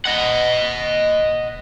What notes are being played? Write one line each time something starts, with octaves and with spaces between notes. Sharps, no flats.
D#5 F#5